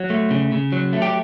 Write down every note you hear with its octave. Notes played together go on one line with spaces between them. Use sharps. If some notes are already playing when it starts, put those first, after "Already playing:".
Already playing: F#3
A3
C#3
C#3
F#3
A3
G4